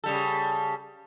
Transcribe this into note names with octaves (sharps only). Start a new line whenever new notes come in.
C#3 G3 A4